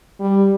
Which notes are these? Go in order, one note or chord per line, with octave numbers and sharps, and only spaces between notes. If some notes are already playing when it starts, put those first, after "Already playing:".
G3